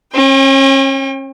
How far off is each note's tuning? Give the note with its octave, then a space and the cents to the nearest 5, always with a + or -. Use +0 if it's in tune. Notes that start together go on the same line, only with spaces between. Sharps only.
C#4 -40 G5 +35